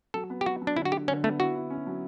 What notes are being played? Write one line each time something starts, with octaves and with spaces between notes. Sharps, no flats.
F#3 A4
B3
G4
F#3 F#4
F#3
D4
D3 E4
F#4
D3 G4
D3 C#4
A3 B3
E4 F#4
E4
C#4
F#3